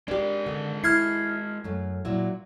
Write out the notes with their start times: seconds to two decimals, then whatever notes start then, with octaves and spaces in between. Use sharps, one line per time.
0.08 G#3 D4 G4 A#4
0.46 D3
0.84 E4 F6 G#6 C7
1.64 F#2 A3
2.05 A#2 F#3 E4